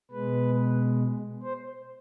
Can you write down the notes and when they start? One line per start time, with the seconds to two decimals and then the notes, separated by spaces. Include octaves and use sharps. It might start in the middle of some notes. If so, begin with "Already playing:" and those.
0.11 B2 G#3 B4
1.43 C5